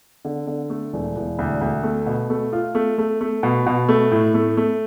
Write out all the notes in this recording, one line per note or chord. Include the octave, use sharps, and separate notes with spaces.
D3
D3
A3
E1
E1
D2
D2
A3
B2
A3
F4
A3
A3
A3
B2
B2
A3
A2
A3
A3